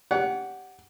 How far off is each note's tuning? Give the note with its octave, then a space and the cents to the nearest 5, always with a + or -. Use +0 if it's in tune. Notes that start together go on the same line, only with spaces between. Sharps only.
G4 +0 C#5 +45 F#5 +0